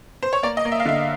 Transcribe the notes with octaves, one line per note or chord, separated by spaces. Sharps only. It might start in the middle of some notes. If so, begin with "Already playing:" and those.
C5
C#5
A#3 D5
D#5
A#3
E5
F5
D3 E5